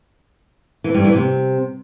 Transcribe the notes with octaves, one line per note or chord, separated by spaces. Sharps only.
E3
G2
E3
C3